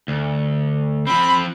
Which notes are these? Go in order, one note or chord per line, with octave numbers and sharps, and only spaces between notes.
D2
F3 C4 B5